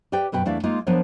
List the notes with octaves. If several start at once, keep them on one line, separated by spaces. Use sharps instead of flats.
G4 B4 D5 G5
F#2 B2 B4 G5
E2 A3 D4 E4 D5 F5
G#3 A#3 D#4 F4
F3 B3 D4 A#4 C#5